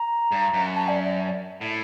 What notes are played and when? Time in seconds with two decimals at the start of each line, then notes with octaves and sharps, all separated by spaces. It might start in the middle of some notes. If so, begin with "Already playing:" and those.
Already playing: A#5
0.32 G2
0.53 F#2
0.75 A5
0.88 D5
1.04 D5
1.61 A2